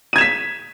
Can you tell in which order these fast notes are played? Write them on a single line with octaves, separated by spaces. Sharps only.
D#7 G#6 E7 B6